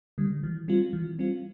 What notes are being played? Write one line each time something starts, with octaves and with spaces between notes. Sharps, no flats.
D3 G3
E3
G3 C4 F4
E3
G3 C4 F4